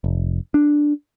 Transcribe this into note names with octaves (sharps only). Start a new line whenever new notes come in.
F1
D4